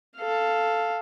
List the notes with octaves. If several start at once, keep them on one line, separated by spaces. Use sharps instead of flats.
A4 F5